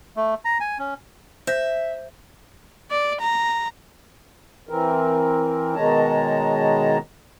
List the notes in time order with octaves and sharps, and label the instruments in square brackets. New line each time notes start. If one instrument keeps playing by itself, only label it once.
[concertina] A3
A#5
G#5
C#4
[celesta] C5 G6 A#6 [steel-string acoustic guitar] E5
[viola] D5
A#5
[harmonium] E3 C4 A#4
B2 D#3 G#3 C#5 A5 A#5